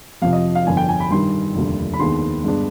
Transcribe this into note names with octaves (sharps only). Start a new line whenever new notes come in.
F2 C3 F3 F5
D#5
F5
G1 F2 D3 G#5
G5
G#5
B5
G2 D#3 G3 C6
F1 D#2 D3 G3
B5
D#2 D#3 G#3 B3 D4 C6
G2 D3 G#3 B3 D4